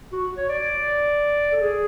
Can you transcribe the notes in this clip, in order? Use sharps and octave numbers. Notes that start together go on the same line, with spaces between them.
F#4
C#5
D5
A4
G#4